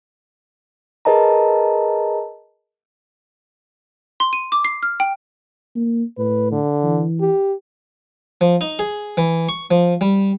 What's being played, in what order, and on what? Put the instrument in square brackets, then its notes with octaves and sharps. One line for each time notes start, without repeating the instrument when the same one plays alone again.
[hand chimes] G#4 A#4 B4 D#5 A5 A#5
[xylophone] C6
D#7
D6
C7
F6
G5
[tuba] A#3
[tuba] A2 [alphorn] B4
[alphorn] D3
[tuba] E3
[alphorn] G4
[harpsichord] F3
D#4
G#4
E3
C#6
F3
G3